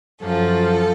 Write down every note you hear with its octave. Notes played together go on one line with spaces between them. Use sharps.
F#2 F3 A4